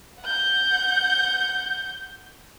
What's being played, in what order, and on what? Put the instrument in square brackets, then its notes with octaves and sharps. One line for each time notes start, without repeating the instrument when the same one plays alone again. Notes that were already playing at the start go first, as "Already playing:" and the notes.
[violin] F#5 G6